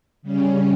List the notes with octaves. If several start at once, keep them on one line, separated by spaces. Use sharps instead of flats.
C#3 G3 C#4